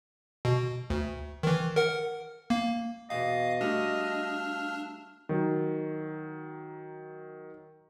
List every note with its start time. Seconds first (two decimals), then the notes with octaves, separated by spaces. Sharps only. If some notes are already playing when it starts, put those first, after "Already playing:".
0.45 B2
0.90 D2
1.43 D#3 E3
1.76 A#4 F#5
2.50 A#3
3.10 E2 B2 D#5 F5
3.61 G3 A3 D4 F#4 F5 E6 F6
5.29 D#3 F#3